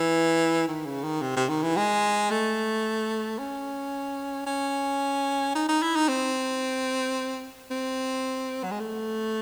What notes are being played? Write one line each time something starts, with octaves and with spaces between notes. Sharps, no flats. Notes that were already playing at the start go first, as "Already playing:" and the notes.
Already playing: E3
D#3
C#3
D#3
C3
C3
D#3
E3
G#3
A3
C#4
C#4
D#4
D#4
E4
D#4
C4
C4
F#3
G#3
A3